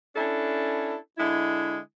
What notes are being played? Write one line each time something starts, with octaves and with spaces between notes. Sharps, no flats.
C#4 D4 E4 A4
D3 G#3 E4